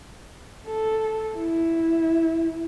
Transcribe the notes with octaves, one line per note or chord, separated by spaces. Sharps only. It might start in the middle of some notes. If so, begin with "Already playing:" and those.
A4
E4